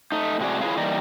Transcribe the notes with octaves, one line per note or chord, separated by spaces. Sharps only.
A3 D#4
A2 C3 G#3 F#4 G#4 D5
E4 F4 G#4 B4 C#5 F5
E3 G3 A#3 D#4 A#4 D5